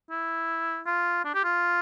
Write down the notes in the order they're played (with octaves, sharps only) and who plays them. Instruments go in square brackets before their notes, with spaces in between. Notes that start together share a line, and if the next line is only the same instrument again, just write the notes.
[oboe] E4
F4
D4
G4
F4